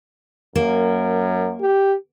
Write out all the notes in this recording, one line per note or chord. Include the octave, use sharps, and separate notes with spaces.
F#2 A#3
G4